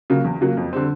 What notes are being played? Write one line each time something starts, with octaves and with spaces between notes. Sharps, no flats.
C#3 F#3 A#3
E2
C#3 F#3 A#3
F2
D3 G3 C4